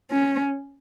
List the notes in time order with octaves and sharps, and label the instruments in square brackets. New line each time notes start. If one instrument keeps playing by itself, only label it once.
[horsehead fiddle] C#4